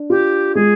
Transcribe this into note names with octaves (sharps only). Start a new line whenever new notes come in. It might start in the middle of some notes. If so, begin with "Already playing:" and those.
Already playing: D4
F4 G4
G#3 G#4